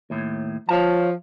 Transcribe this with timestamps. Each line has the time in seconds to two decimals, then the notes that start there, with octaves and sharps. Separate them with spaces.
0.10 D#2 A2
0.69 F3 C#5 F5 A5